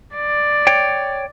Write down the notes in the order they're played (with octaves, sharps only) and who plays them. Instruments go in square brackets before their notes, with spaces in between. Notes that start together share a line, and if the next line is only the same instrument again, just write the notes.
[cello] D5
[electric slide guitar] C#5 G5